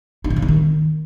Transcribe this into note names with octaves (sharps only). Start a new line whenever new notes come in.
D#4
B2
C#3
D#4
D#3